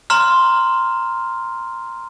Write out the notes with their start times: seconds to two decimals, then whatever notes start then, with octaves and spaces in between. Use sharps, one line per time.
0.10 A#5 C6 F6